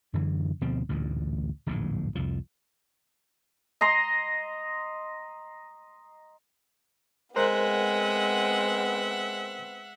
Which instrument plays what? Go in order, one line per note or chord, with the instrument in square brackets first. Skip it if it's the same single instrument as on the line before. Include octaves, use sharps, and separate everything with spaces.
[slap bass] F#2 D3 E3
D2 B2 F3 C4
A1 D2 G2 A#2
D1 A#1 E2 G#2
C2 F2 F3
[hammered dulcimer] D#5 A#5 C6
[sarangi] G#3 [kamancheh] B3 C4 [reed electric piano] A#4 C5 F#6 [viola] E5 F#5